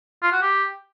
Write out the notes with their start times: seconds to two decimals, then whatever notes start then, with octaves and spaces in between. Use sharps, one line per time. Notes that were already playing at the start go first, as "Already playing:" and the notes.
0.23 F4
0.32 F#4
0.42 G4